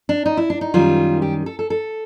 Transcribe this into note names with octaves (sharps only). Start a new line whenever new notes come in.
D4
D#4
E4
D4
D#4
F#2 D#3 G3 F4
G4
A4
A4
A4